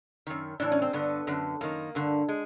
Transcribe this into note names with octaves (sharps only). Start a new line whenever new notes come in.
F#2 D#3
A2 E3 D4
C#4
C4
G2 D3 B3
F#2 D3
F#2 D#3 A#3
G2 D3
G#3